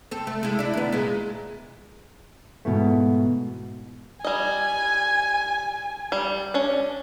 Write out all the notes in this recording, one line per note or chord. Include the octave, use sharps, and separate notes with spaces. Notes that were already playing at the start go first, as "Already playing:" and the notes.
C4 A4
A3
G#3 E4
D4 E4
D#2 B3
A#2 G#3
G#2 B2 E3 A3
G3 D#5 G#5
G3
C#4 D4